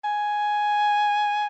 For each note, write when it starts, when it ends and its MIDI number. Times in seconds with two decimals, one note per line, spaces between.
0.04 1.47 80